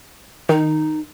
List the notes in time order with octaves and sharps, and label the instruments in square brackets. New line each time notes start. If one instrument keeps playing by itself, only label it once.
[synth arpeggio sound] D#3 [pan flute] D#4